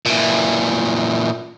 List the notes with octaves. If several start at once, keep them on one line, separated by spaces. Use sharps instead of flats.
A#2 E3